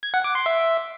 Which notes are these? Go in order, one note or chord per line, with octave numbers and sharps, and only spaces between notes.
G#6
F#5
D6
C6
E5